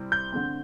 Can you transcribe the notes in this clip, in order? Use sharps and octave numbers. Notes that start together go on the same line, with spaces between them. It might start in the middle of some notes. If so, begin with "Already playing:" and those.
Already playing: C3 G3 C4 E4
G6
D3 A3 C4